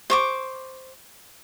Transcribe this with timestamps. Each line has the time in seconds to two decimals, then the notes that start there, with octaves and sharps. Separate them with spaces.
0.10 C5 C#6 D6